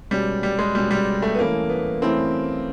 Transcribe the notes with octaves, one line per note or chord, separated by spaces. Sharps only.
B2 G3 G#3 C#4
G3
G#3
B2 G3 G#3 C#4
G3
A3
B3
E3 A3 A#3 C#4 E4 A4
B3
E3 A3 C4 C#4 E4 A4